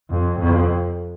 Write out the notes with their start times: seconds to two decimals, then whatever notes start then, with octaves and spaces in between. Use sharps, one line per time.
0.10 F2
0.39 F2